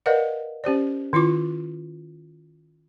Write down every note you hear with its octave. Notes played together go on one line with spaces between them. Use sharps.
A#4 B4 D5 D#5 F5 F#5
C#4 G4 C5 D5
D#3 E4 F4 D6